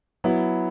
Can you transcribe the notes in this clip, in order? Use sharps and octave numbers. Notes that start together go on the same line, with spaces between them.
F#3 B3 E4